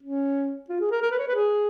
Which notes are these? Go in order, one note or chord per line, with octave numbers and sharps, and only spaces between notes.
C#4
F4
G#4
A#4
A#4
B4
C#5
B4
G#4